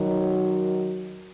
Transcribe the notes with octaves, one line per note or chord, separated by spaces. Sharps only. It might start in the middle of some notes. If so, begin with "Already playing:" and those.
Already playing: D#3 F#3